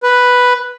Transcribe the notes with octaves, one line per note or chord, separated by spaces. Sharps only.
B4